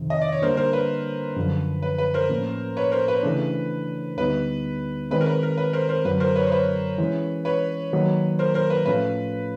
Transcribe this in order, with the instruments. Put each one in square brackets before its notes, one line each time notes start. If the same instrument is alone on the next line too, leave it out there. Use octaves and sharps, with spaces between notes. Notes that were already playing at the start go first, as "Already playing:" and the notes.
Already playing: [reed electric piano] F2 C3 D#3
[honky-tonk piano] D#5
D5
C#5
[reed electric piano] D3 G3 A#3 D4 [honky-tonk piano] A#4 C5
[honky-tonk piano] A#4 C5
B4
[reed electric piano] F#2 D3 F3
[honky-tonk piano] B4
B4
A#4 C5
[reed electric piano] A2 F3 A#3 C#4
[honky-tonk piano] B4 C#5
A#4 C5
B4
[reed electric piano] C#3 E3 A3 D4
[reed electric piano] D2 D3 G3 B3 D#4 [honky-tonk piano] B4
[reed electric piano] D#3 G#3 C4 [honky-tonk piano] B4
[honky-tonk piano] A#4
B4
A#4
B4
A#4 C5
A#4 C5
[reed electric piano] F#2 D3 F#3 [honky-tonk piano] B4
[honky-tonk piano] A#4 C5
B4 C#5
C5
B4 C#5
[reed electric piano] E3 G#3 C#4
[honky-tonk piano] B4 C#5
[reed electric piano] D#3 F#3 A#3 D#4
[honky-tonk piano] A#4 C5
A#4 C5
B4
[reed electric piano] A2 F3 A3 C#4 F4 [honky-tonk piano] B4